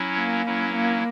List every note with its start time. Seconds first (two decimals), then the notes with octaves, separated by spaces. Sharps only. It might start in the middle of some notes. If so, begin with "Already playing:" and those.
Already playing: F#3 C#4 E4
0.17 A#3
0.46 F#3 C#4 E4
0.75 A#3